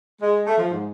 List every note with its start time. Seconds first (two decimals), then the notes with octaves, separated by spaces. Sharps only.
0.22 G#3
0.47 A3
0.58 F3
0.71 G#2